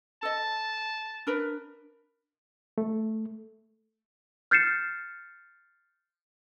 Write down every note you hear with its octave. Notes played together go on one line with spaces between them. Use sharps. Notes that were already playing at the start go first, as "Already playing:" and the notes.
A4 D#5 A5
D4 A#4 B4
A3
F6 G6 A6 C7 C#7 E7